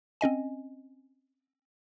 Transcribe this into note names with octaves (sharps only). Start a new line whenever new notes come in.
C4 C#4 D#5 G#5